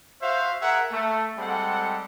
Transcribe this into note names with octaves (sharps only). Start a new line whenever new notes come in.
F#4 C5 E5 F5
G#4 A#4 E5 F#5
A3
G3 G#3 C4 A4 F#5